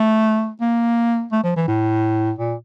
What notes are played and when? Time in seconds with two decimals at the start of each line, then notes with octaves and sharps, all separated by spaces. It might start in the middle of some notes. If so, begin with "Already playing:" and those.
Already playing: A3
0.61 A#3
1.32 A3
1.43 F3
1.56 E3
1.68 A2
2.39 A#2